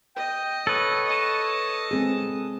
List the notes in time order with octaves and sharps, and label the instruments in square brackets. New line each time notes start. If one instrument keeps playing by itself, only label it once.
[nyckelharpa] D#5 [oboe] G5
[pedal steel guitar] A4 B4 [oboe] C#5
[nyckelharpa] D#5 A5
[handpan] G#3 C4 G#4